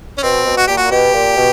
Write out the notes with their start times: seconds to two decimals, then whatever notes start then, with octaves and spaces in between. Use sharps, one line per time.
0.18 C#4
0.23 B2 C4
0.45 B2
0.57 F#4
0.67 A#2 G4
0.77 F#4
0.91 B2 G4
1.14 A#2
1.36 B2